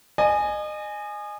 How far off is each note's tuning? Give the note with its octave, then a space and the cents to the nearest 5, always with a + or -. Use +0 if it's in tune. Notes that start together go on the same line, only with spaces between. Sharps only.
D#5 -35 G#5 +0